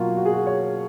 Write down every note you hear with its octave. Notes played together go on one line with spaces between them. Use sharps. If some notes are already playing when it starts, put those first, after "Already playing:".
Already playing: B2 F#3 A#3 F4 F#4
F#4
G#4
F#4
C#5